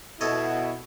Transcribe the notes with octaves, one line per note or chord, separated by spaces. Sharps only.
B2 E4 A4 C#5 D#5